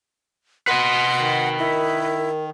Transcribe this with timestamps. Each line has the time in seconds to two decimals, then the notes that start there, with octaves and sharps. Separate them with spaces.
0.68 B4 D#5 F#5 C6
1.20 D#3
1.59 E4 A#4
2.18 A#4